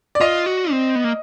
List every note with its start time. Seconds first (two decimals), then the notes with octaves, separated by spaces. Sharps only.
0.15 D5
0.21 F4 D#5
0.46 F#4
0.71 C4
0.95 B3
1.04 A#3